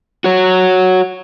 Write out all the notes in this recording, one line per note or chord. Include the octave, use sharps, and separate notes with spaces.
F#4 C#5